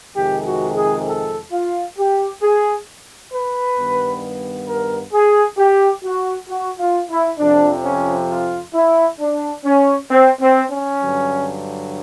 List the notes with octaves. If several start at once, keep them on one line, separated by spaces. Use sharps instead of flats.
F2 C3 D#3 G#3 G4
F#4
G#4
A4
F4
G4
G#4
B4
G2 D#3 G3 B3
A#4
G#4
G4
F#4
F#4
F4
E4
F2 C3 F3 D4
C#4
F4
E4
D4
C#4
C4
C4
C#4
G2 D3 F#3